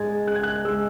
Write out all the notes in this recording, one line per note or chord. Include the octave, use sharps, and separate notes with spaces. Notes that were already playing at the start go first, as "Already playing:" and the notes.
Already playing: G#2 G#3 G#6 A6
G#3 F#6
G#6
F#6
G#3 E6